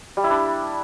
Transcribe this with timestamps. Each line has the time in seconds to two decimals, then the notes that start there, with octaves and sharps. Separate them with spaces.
0.17 G3
0.24 E4
0.30 D4